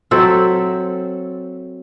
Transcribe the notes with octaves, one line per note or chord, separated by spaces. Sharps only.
F#3 C4 A4 E5